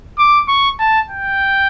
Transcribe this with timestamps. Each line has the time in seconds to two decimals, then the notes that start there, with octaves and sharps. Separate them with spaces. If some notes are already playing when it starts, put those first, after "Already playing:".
0.18 D6
0.48 C#6
0.79 A5
1.09 G5